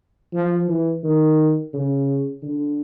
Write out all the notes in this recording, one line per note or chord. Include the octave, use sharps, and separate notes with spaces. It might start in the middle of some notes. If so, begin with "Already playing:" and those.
F3
E3
D#3
C#3
D3